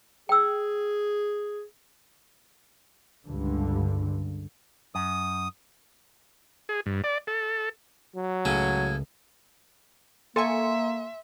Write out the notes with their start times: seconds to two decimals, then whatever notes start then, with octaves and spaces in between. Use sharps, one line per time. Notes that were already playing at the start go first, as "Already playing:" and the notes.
0.29 G#4 G5 E6
3.24 C#2 G2 D3
4.95 F#2 D#6
6.69 G#4
6.86 G2
7.04 D5
7.27 A4
8.15 F#3
8.45 C#2 A2 C#3 C#4 G#6
10.36 A#3 A4 E5 G#5 C6 C#6